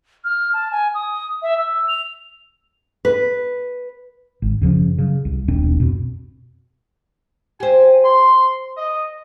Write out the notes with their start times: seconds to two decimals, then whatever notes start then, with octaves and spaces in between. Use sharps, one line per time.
0.24 F6
0.53 A5
0.72 G#5
0.95 D#6
1.42 E5
1.58 E6
1.88 F7
3.05 B4
4.42 G#1
4.61 F#2 C#3 F3 C#4
4.98 C#3 F#3
5.25 C2
5.48 D#1 B1 C4 D4
5.80 F2 B2
7.60 G4 C5 G#5
8.04 C6
8.77 D#5